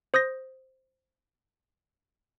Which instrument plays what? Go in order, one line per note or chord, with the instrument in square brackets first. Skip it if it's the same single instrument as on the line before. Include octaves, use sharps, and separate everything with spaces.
[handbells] C5 D#6 G6 A#6